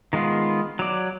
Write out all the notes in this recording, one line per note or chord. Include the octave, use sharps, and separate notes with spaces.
D#3 G#3 B3 F4
F#3 D5